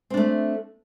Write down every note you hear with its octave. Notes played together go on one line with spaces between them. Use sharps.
A3 C4 D4